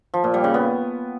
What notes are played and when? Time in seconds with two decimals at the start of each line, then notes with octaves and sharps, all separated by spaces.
0.14 F3
0.24 A#2
0.34 G3
0.44 C#3
0.54 B3